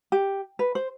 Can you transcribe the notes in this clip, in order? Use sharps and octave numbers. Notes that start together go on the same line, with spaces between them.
G4
B4
C5